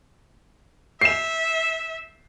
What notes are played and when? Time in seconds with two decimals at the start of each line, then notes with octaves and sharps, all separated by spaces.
1.01 E5 C7 E7